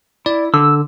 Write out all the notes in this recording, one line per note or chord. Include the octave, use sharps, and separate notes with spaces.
E4 D5
D3 E6